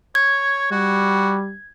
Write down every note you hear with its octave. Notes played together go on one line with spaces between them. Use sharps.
C#5 G#6
G3 F#4